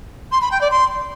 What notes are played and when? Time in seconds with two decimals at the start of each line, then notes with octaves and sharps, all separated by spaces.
0.31 C6
0.41 B5
0.51 G5
0.61 D5
0.71 C6